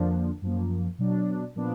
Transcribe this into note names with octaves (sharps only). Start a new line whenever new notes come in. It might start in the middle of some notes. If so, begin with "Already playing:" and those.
Already playing: F2 D3 F3 A#3 D4
F#2 F3 A#3
B2 F#3 D4
A#2 F3 B3 D4